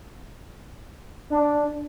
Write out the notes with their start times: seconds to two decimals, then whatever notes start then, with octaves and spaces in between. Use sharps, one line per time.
1.30 D4